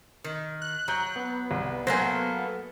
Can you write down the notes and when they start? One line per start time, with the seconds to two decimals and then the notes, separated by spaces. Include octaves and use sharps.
0.24 D#3
0.62 F#6
0.88 F#3 A#5 G6
1.16 B3
1.51 C2
1.87 F#3 A3 A#3 C5 G#5 A#6